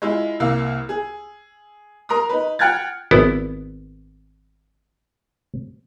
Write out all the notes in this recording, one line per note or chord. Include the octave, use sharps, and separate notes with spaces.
G#3 E4 F4
C2 A#3 F5 E6
G#4
A#4 A#5 C6 D#6
D#4 B4
F#5 G5 F6 F#6 G#6 A6
G#1 B3 E4